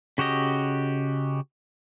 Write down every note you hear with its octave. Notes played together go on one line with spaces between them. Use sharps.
C#3 F#4 G4 D#5